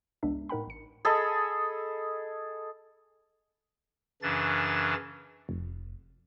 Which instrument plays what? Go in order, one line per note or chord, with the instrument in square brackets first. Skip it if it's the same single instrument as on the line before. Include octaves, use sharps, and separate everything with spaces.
[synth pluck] G#1 C#2 G#3 B3 D4 E5
A2 D#4 A#4 F#5 G5 B5
A1 C#7
[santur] G#4 A4 D#5 B5
[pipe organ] F#2 C#3 E3 D4 A6
[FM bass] F1